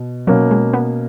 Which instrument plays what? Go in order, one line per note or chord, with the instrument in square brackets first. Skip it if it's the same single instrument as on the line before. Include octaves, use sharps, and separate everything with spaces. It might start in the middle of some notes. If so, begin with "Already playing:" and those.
Already playing: [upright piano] B2
[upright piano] B2 A#3 C#4 [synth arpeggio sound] F#3
[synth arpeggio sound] G#3
B3